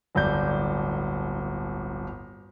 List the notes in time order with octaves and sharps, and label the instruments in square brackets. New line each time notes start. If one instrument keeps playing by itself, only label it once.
[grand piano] D1 G1 D5 G6